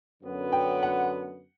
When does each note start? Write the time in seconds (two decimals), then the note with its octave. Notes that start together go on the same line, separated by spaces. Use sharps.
0.22 F#2 D3 F#3 B3
0.52 G5
0.83 F#5